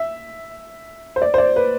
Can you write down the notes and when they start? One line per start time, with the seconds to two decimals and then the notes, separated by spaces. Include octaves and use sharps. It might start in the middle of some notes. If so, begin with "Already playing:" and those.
Already playing: E5
1.16 C5
1.22 D5
1.34 C5
1.38 D5
1.56 B4